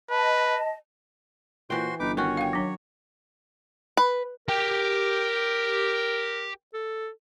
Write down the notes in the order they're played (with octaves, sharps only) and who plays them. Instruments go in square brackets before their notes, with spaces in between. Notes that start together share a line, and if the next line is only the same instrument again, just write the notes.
[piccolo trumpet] B4 [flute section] D#5 A5
[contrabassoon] A#2 [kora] E3 G5 [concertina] F#4 C5 C6
[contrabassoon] G1 [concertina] D#4 B4 D6
[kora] D#3 C#4 F#4 [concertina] C#5
[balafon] F5 G5
F#3 D4
[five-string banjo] B4
[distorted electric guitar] G4 G5 [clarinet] A#4
[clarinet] A4